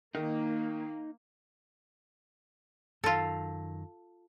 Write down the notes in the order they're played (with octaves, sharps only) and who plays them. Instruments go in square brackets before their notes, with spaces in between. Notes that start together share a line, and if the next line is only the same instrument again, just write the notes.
[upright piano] D#3 [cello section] A#3 [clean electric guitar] D#4
[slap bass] F#2 D#3 [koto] F4 A4